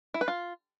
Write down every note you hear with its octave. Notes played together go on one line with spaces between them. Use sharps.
E4
B4
F4